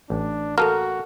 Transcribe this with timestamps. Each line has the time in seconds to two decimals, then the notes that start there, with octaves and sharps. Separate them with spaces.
0.10 A1 D4
0.58 A#3 F#4 A4 A5 F6